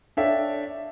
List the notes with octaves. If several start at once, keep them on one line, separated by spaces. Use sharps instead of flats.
D4 A4 C#5 E5 F5 G5